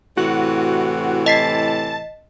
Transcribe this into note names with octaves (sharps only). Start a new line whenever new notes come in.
A2 C3 E3 F#4
D#5 A5 B6 C7